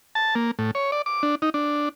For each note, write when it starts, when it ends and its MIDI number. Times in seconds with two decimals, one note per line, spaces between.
0.15 0.35 81
0.35 0.51 58
0.59 0.71 45
0.75 0.91 73
0.92 1.02 74
1.06 1.22 86
1.23 1.35 62
1.42 1.50 63
1.54 1.89 62